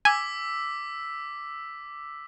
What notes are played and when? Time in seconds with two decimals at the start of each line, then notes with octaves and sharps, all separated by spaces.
0.05 G#5 D6 E6 B6